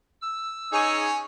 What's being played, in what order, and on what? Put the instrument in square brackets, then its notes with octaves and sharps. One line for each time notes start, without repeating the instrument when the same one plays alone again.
[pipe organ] E6
[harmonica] C#4 C#5 G#5 [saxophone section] D#4 G#4